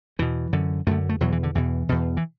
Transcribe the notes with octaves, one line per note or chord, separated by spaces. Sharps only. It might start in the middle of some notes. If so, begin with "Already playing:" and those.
E2 B2 E3
F#2 D3
F#2 D3 A3
A3
E2 B2 F#3
E3
D3
E2 B2 E3
E2 B2
E3